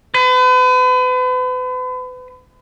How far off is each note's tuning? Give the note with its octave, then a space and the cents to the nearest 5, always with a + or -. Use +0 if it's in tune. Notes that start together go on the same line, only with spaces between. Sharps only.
B4 +40